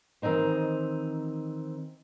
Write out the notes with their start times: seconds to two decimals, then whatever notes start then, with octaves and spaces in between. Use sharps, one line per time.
0.22 D#3 E3 C4 D#4 C5